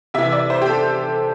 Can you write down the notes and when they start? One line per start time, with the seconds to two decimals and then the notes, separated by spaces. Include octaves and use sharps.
0.14 C3 E3 E5
0.32 D5
0.50 C5
0.62 G4
0.68 A4